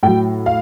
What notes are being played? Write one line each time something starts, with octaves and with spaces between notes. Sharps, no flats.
A2 F#3 G5
F5